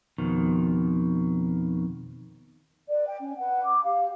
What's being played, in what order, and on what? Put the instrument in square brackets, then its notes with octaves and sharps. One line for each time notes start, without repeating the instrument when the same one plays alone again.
[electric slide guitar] F2 B2 D#3
[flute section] B4 D5
G5
C#4
B4 F#5
D6
G4 F5